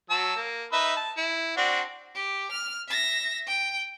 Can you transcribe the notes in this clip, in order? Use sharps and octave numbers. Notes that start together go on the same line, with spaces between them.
F#3 A5 E6
A#3
D#4 B4 E5
A5
E4
C4 D4 F#4
G4
F6
E5 A#6
G5